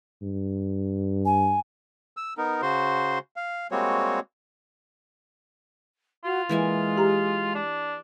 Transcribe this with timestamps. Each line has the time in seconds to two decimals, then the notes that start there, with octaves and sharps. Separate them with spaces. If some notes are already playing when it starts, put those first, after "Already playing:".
0.22 G2
1.25 G#5
2.17 E6
2.37 B3 D#4 A#4
2.62 C#3 F#4 C5 C6
3.36 F5
3.71 G3 G#3 A#3 C4 F#4 C#5
6.25 F4 F#4
6.49 E3 G#3 A#3 G#5
6.97 G4 A#5
7.55 D4